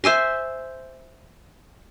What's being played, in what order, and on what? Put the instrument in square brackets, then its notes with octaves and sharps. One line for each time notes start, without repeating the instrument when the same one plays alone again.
[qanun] C5 E5 G#5 C6